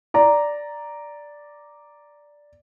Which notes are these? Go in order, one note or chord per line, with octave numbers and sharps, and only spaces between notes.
D5 A#5